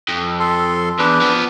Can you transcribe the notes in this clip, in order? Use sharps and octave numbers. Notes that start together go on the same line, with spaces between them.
F2
A4 C6
E2 D4 B4
F3 B3